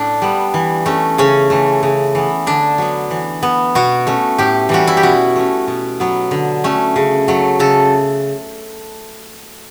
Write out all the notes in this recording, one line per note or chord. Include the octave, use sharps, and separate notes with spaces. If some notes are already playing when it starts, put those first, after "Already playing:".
Already playing: A2 D4
G3 B3
E3
A3 C#4
C#3 C#4
E3 A3
C#3
E3 B3
D3 D4
F#3 B3
E3
B3
B2 F#4
A3 C#4
A2 G4
E3 G3 C#4 F#4
E4
G4
B2 F#4
A3 C#4
B2
F#3 B3
D3
A3 C#4
C#3
F#3 A3
C#3 A4